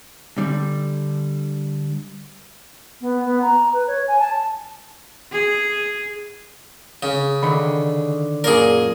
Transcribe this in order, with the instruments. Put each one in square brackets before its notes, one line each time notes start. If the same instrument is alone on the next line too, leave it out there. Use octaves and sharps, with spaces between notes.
[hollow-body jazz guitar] D3 G3
[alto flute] B3
B3
A#5
B4
C#5
G#5
A5
[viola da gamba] G#4
[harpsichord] C#3
[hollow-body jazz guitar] D3 D#3 B5
[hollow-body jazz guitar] F#2 A#2 D5 [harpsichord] G#4 A#4